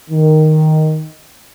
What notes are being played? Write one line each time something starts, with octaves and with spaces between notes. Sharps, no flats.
D#3